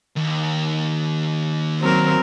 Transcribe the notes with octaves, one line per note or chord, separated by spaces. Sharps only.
D#2
F#3 C4 A#4